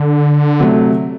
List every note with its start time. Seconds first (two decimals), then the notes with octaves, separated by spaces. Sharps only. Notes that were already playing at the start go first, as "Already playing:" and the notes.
Already playing: D3
0.60 C3 F#3 A3